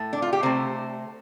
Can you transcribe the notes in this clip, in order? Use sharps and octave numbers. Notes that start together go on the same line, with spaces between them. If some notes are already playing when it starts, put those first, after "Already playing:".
Already playing: A2 A3
D4
F4
G4
C3 A3 C5